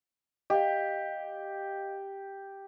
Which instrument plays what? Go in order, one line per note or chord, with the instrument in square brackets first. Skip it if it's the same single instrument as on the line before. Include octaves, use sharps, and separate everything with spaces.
[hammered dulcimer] G4 [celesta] D#5 F5